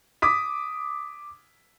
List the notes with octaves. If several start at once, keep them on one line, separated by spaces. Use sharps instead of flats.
D6 D#6 B6